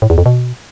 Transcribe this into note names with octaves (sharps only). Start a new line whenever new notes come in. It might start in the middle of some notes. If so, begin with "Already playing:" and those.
A2
E2
F2
B2